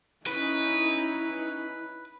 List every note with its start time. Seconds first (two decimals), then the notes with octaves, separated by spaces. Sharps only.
0.27 C#4 D#4 E4 B4